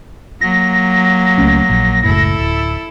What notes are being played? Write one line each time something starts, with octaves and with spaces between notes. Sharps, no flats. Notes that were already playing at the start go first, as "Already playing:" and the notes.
F#3 A#3 A#6
C#2 A3 C#4
A#1
F#1 C#2 A2 E4 A4
D1